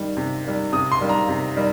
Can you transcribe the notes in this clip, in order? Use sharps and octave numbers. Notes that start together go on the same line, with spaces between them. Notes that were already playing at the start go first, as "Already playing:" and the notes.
Already playing: D#3 G3
C3
D#3 G3
C3 D#6
C6
D#3 G3
A#5
C3
D#3 G3